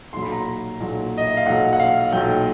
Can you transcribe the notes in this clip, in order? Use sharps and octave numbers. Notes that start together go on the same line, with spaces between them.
B1 A#2 F#3 C6
B5
A#5
B5
B1 A#2 F#3
D#5
E5
F5
B1 A#2 F#3 F#5
F#5
F5
B1 A#2 F#3 G5